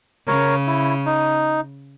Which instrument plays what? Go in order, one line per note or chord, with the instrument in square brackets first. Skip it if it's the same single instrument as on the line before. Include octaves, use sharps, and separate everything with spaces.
[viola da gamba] C#3 [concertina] A#4 C#5
[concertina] E4
D#4